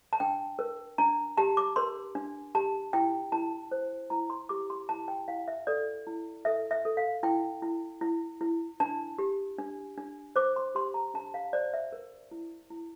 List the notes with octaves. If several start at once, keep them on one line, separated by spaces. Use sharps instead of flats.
A5
D4 G5
A#4
D4 A#5
G4 A5
D6
A#4 C6
D4
G4 A5
E4 G5
E4 A5
C5
E4 A#5
C6
G4 D6
C6
E4 A5
G5
E4 F5
E5
A4 D5
E4
A4 E5
E5
A4
F5
E4 G5
E4
E4
E4
D4 A5
G4
D4
D4
C5 D6
C6
G4 C6
A#5
D4 A5
F5
C5 D5
E5
A#4
E4
E4